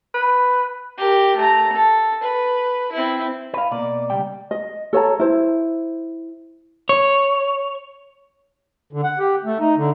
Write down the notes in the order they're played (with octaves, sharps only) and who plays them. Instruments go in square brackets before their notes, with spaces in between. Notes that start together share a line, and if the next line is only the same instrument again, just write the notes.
[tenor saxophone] B4
[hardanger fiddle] G4 A#4
A3 A#5
A4
B4
C4 E4
[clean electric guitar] B4 F5
[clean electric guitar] B2 A#3 [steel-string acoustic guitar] D5
[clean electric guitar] C#2 G3 G5
[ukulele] D#5
A4 C#5 A5 A#5
E4 C5
[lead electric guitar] C#5
[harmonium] D3
F#5
G4
A3
D#4
D3